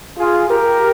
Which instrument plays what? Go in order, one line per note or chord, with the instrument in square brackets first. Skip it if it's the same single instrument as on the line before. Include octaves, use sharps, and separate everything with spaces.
[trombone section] F4 G#4
G4 A#4